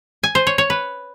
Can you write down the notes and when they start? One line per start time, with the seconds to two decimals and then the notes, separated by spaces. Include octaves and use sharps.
0.23 G#5
0.35 C5
0.47 C#5
0.58 C#5
0.70 B4